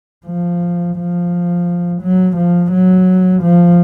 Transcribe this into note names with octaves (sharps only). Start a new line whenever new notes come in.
F3
F3
F#3
F3
F#3
F3